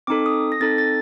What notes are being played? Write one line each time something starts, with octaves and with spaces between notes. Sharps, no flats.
C4 D#4 A4 D6
D#6
A#6
C4 D#4 A4 A6
A6